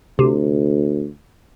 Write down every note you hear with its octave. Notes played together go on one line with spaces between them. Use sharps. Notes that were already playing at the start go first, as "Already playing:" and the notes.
D2 C3